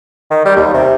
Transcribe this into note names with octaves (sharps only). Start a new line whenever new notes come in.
D#3
G3
D#2
C3